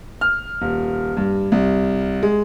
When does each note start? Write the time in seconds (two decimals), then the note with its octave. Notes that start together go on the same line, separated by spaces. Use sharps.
0.21 F6
0.62 D#1
1.17 G2
1.52 C2
2.23 G#3